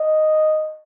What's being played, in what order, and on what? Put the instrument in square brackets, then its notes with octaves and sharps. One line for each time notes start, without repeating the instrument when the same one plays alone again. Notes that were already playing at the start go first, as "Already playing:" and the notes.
Already playing: [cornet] D#5